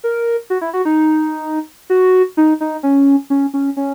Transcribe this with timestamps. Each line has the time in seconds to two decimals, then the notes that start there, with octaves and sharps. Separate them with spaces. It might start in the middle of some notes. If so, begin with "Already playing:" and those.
0.04 A#4
0.50 F#4
0.61 E4
0.73 F#4
0.85 D#4
1.90 F#4
2.37 D#4
2.61 D#4
2.83 C#4
3.30 C#4
3.54 C#4
3.77 C#4